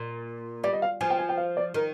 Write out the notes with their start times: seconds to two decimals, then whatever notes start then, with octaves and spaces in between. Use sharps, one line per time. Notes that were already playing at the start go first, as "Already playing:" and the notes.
Already playing: A#2
0.64 G3 D5
0.73 D#5
0.82 F5
1.01 F3 G#5
1.10 G5
1.19 G#5
1.29 G5
1.37 F5
1.57 D5
1.74 D#3 A#4